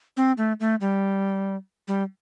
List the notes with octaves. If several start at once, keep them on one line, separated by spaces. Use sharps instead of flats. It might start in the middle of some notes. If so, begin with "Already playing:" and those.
C4
A3
A3
G3
G3